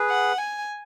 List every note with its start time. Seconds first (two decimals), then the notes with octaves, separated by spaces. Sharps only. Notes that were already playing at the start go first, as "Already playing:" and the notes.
Already playing: G#4 B4
0.10 F#5
0.38 G#5